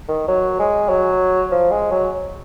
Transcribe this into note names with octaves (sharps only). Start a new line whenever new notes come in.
D#3
F#3
G#3
F#3
F3
G#3
F#3